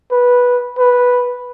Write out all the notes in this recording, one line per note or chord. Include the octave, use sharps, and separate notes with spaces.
B4
B4